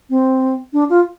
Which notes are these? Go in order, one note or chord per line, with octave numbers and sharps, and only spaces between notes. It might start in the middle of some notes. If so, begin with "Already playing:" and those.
C4
D4
F4